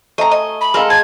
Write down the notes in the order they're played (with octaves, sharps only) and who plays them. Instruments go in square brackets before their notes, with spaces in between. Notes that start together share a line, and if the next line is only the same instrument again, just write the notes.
[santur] A3 G#5 [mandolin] D#5 A#5
[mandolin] D#5
[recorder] B5
[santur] G#3 F5 G#5 [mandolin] A4 A#4
[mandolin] A5 [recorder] G#6